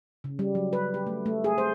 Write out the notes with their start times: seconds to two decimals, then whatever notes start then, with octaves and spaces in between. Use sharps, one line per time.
0.24 C#3
0.39 G3
0.55 F#3
0.73 B4
0.94 G4
1.07 A3
1.26 A3
1.44 G#4
1.58 C5